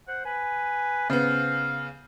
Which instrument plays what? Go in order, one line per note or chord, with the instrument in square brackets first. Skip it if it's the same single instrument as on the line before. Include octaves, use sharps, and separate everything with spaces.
[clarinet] C5 [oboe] F#5
[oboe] B4 [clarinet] G#5
[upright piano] C#3 B3 [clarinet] C5 [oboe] F5